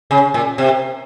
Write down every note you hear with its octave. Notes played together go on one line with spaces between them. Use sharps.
C#3
A#2
C3